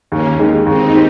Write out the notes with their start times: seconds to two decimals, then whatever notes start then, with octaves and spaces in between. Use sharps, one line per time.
0.11 D#2 A#3 C#4
0.39 D#3 G#3 D#4 G4
0.66 D#2 C4 D#4
0.94 G4